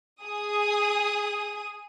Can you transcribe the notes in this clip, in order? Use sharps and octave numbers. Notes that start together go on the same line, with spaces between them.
G#4 D#6